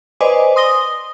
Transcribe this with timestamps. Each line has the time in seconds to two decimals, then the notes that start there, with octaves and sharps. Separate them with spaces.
0.20 B4 C5 D5 D#5 G#5 D6
0.56 C6 D#6 A#6 G7